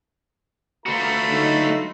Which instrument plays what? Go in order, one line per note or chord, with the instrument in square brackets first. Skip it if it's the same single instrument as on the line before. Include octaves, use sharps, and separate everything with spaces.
[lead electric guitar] A3 F#4 [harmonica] F4 B4 A#5
[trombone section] D3 F#3 D#4